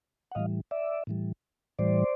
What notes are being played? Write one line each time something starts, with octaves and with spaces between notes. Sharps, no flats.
F#5
A2 E3 G3 D#5 F5
D5 E5
A2 E3 G3
A2 E3 G3 C5 D5